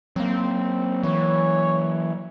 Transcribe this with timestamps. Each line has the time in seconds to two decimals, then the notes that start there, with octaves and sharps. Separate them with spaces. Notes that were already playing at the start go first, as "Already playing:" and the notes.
0.16 F#3 A#3 C4
1.03 E3 C#5